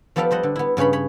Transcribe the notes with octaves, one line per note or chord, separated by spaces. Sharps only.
F3 B3 G4 A4 D5 F5
G3 C5 D#5 F#5
D3
B3 E4
G2 C#3 G#4 C#5 B5
C#5 B5